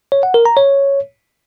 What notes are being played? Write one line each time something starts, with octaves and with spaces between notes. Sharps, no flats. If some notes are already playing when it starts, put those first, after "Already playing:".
C#5
F#5
A#4
A#5
C#5